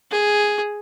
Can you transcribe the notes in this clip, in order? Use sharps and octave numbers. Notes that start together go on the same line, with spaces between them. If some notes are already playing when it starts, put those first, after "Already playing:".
G#4